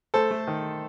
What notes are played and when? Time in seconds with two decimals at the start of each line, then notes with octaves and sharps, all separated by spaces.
0.14 A3 A4 C5
0.31 A3
0.47 D#3